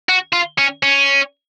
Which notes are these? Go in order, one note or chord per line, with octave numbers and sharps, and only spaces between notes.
F#4
F4
C#4
C#4